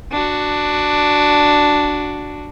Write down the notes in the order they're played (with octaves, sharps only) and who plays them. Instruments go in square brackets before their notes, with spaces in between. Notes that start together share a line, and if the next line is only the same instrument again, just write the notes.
[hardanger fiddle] D4 F#4